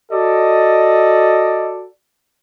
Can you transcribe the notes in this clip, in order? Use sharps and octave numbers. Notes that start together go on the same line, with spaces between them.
F#4 A4 D5 D#5